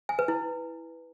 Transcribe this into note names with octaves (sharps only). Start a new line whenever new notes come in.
G#5
B4
E4